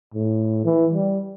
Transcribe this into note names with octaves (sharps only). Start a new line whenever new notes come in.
A2
E3
G3